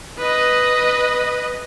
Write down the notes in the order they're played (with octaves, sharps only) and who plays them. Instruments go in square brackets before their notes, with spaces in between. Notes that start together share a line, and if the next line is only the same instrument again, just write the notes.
[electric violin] B4 D#5